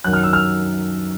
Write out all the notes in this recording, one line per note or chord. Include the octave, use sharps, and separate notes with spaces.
F#2 D#3 F#3 F#6
F6
E6
F6